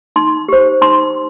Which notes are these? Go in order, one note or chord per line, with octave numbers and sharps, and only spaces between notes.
D#4 C6
G4 C5
D#4 C6